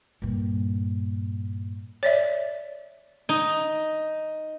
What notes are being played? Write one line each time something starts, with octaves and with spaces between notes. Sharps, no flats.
G2 A#2
C#5 D5 E5
D#4